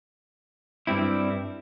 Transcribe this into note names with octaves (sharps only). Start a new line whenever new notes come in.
G2 G3 C4 E4